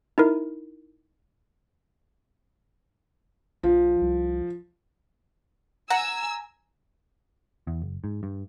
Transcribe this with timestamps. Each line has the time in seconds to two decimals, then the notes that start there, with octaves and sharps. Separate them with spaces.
0.18 D#4 E4 A#4
3.63 A#1 F3
4.01 C2
5.90 F#5 G#5 A#5 E6
7.67 E2
7.82 F#1
8.04 G#2
8.23 G2